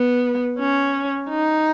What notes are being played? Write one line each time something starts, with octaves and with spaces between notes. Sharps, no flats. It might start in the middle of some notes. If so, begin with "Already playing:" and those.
Already playing: B3
C#4
D#4